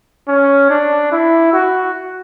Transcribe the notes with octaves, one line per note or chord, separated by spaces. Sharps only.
C#4
D4
E4
F#4